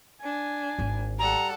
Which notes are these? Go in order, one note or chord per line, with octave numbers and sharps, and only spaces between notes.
D4 G#5
G#1
G3 A4 F#5 A#5